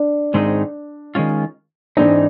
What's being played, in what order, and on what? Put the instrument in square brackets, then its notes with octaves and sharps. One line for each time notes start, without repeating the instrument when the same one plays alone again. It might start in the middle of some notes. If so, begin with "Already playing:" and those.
Already playing: [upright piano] D4
[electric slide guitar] G#2 D#3 G#3 C4 D#4
D#3 G#3 C#4 F4
[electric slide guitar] G#2 E3 G#3 C4 D#4 [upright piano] D4